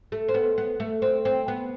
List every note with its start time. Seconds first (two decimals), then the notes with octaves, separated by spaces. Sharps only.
0.12 A3
0.28 C4
0.34 B3
0.58 B3
0.80 A3
1.02 C4
1.25 C4
1.48 B3